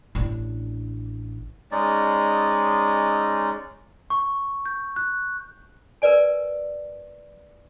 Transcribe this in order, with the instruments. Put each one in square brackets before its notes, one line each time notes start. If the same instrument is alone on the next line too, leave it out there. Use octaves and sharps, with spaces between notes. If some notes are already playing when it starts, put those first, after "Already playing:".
[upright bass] A1 D4
[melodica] G#3 C#4 D#4 D5
[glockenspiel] C#6
G6
F#6
[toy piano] A#4 B4 D5 G#5